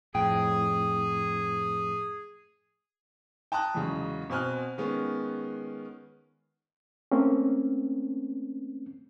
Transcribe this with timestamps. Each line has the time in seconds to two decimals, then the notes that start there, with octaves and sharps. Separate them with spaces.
0.15 F2 A2 G#4 G5
3.52 G5 A5 A#5 D#6 F#6
3.75 E2 G#2 C#3 F#3
4.30 B2 C4 G#5 F6 F#6
4.78 D#3 G#3 B3 C#4
7.12 A3 A#3 C4 C#4